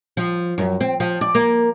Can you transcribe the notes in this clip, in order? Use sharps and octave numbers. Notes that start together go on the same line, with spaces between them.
F3
F#2
C4
F3
D5
A#3